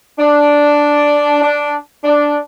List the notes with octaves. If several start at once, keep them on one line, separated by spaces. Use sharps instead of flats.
D4
D4
D4